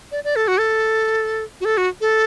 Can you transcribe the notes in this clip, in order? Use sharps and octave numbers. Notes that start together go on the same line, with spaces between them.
D5
D5
A4
F#4
A4
F#4
A4
F#4
A4